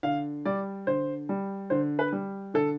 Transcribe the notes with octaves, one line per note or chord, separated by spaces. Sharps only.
D3 F5
G3 D5
D3 C5
G3
D3 C5
B4
G3
D3 A4